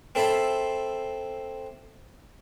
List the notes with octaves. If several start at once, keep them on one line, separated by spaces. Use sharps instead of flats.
C4 A4 E5 B5 C6